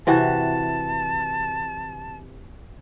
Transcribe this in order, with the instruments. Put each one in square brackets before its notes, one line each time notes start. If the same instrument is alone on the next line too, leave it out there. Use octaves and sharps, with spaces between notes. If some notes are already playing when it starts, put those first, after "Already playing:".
[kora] C3 E3 F#4 [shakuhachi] A5